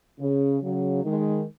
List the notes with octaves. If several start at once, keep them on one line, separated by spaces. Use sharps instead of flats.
C#3
C#3 F#3
D#3 G#3